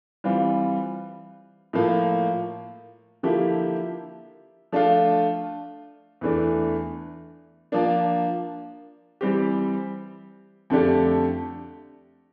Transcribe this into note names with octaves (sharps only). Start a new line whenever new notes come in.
E3 G3 C4 F4
A2 F3 A#3
D3 F3 A#3 E4 G4
F3 A3 D4 F4
E2 E3 A3 D4
F3 A#3 D4
E3 G3 C4 G4
F2 D3 A3 D4 G4